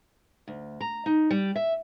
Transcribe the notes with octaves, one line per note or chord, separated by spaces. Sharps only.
D2
A#5
D#4
G3
E5